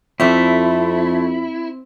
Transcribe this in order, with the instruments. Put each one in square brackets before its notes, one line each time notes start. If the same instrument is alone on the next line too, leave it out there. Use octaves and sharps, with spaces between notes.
[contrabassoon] F2 [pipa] G3 A3 [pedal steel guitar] C4 E5 [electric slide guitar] E4